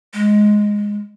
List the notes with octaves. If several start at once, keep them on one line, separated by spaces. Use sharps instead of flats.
G#3